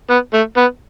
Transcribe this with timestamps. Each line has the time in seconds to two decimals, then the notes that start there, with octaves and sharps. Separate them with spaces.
0.10 B3
0.33 A3
0.57 B3